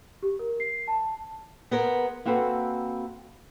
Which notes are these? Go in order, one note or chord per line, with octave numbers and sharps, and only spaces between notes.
G4
A#4
C7
A5
B3 G#4 A#4 C5
A#3 C4 F#4 A4 B4